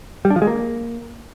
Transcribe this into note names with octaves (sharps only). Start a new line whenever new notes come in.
G3
D4
F3
G#3
A#3